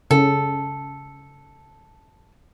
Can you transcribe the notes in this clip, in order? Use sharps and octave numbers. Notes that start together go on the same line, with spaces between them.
C#3 A4